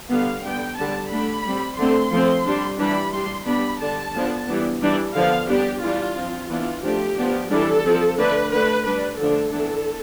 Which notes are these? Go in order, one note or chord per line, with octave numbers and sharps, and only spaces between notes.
D3 G3 B3 F5
D3 G3 B3 G5
D3 G3 B3 D4 A5
D3 A3 D4 B5
G3 C4
D3 A3 C4 C6
F3 A3 C4
G3 D4
E3 G3 D4 B5
G3 D4 C6
G3 B3 D4 B5
D3 G3 D4 A5
D3 F3 B3 D4
E3 G3 B3 D4
E3 G3 D4
D3 F3 B3 F5
G3 B3 D4 G4
E3 G3 D4 F4
F3 C4
E3 B3 D4 F4
F3 A3 D4 G4
F3 B3 D4
E3 G3 D4 A4
F3 C4
D3 A3 D4 B4
D3 A3 D4 B4
G3 D4 B4
D3 F3 A3 D4 A4
E3 B3 D4